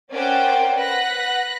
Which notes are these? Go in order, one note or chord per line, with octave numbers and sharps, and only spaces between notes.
C#4 A#4 C5 D5 F#5 G5
B4 F#5 F#6 A#6 B6